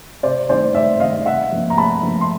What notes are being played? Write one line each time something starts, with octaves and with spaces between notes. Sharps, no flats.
C3 C5 D5
D#3 G3 C4 C5 D5
C3 D5 E5
D#3 G3 C4 D#5 F5
C3 E5 F#5
F3 A#3
A#5
C3 A5 B5
F3 A#3
C6